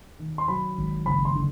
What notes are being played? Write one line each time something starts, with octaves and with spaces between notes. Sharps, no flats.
D#3
C6
F#3 B5
G#1
F#1 B5
C6
D3